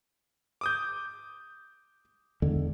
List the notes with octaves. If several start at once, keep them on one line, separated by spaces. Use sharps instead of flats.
D6 D#6 G6
E2 D3 G#3